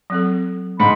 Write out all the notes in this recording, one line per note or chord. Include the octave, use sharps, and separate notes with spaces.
F#3 C4 A4
G#2 B5